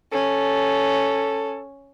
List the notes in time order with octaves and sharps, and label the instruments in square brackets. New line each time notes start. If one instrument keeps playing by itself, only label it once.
[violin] C#4 [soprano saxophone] A4